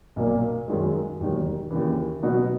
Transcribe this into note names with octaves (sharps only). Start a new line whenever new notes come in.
B1 A#2 A#3
F#2 D#3 G#3
E1 D#2 D#3 F#3
D#2 C#3 E3
B2 F#3 B3 D#4 F#4